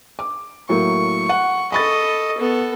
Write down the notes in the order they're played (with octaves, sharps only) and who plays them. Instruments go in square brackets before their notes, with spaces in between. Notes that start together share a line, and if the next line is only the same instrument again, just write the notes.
[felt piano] D6
[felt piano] A2 F#3 A#3 [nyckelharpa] C#6
[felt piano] F#5
[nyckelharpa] A4 D#5 [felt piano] B5 C#6 A6
[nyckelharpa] B3 A4